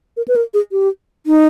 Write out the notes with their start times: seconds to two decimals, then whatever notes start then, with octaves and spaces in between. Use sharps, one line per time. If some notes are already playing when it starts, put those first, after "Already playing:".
0.17 A#4
0.28 B4
0.36 A#4
0.54 G#4
0.72 G4
1.26 D#4